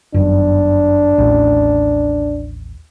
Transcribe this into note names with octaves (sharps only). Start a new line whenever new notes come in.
G1 F#2 D#3 D4
A1 D#2